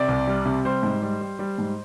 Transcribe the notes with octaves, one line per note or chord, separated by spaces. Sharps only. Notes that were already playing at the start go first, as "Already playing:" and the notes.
Already playing: C3 D5
C2
G3
C3
G3 C5
G#2
G3
G3
G3
G#2